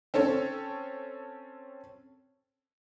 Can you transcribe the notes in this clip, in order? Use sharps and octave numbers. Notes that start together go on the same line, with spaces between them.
C4 C#4 A4 C#5